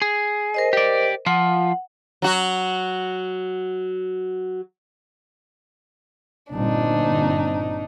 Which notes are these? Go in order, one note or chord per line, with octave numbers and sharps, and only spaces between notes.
G#4
A#4 C5 D#5
G4 D5
F3 F4 F#5
F#3 F#4
G1 A#2 C4 D4 D#4